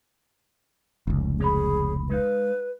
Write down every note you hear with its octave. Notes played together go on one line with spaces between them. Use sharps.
F1 C#2
A#3 G#4 C#5 B5
G#3 D#4 B4 F5